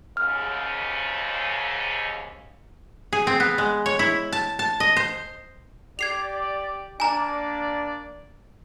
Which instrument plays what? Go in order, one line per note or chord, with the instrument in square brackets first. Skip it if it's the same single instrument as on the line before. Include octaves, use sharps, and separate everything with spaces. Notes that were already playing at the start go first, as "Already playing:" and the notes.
[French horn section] D#2 G#2 C#3 [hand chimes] F6
[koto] G#4
C4
B3
G#3
C#5
E4
A5
A5
D#5
C5
[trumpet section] G4 D5 [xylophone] G#6 C7 F7
[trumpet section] A#3 D4 D5 [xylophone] G#5 A#5